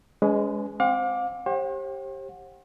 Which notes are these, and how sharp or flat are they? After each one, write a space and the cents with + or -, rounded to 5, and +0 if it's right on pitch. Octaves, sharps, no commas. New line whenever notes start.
G#3 +0 C#4 +40 B4 +30
C4 +0 F5 +40 D6 +0
G4 +0 C5 +45 F#5 -25